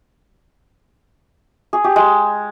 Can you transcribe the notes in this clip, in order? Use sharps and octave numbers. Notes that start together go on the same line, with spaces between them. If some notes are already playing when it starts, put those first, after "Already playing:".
G#4
G4
G#3